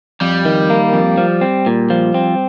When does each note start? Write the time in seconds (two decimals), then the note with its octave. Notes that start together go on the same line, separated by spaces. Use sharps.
0.21 F2 G3
0.45 D#3
0.70 A#3
0.93 F2
1.18 F3
1.41 C4
1.66 A#2
1.90 F3
2.14 C4